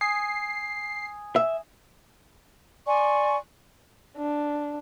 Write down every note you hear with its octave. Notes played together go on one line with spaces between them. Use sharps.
G#5 D#6 G#6 C7
E5
D5 G#5 C6 C#6
D4